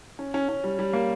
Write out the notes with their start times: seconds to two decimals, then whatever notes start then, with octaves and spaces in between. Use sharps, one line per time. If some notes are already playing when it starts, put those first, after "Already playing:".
0.19 C#4
0.34 C#4
0.49 C#4
0.64 G3
0.79 G3
0.93 A#3